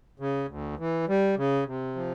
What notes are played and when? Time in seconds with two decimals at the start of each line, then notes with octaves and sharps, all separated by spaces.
0.20 C#3
0.48 D2
0.78 E3
1.08 G3
1.37 C#3
1.67 C3
1.96 F3